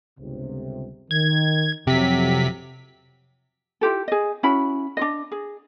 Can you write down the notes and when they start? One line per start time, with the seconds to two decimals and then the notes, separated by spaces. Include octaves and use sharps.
0.19 G1 C#2 C3
1.11 D#3 G#6
1.87 F2 C3 F#3 B6
3.81 E4 F4 G4 A4
4.08 G#4 D#5
4.43 C#4 E4 F#4 B5
4.97 D4 F4 D#5
5.32 G#4